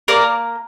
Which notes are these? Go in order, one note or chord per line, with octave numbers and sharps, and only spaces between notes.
A#3 A#4 D5